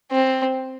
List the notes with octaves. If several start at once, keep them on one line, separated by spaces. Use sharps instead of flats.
C4